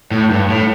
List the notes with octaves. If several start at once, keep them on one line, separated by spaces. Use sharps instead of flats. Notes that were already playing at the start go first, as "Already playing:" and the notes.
A2
G2
A2